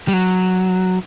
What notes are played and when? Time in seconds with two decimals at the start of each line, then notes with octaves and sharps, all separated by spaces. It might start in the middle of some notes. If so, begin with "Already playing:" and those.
0.08 G3
0.13 F#3